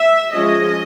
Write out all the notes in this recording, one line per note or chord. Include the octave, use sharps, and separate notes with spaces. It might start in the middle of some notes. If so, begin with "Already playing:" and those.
Already playing: E5
F3 G#3 C#4 D#5